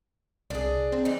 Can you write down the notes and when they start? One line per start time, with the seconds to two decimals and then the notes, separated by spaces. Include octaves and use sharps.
0.50 C2 D4 G#4
0.92 C4
1.05 E3 G3 D#4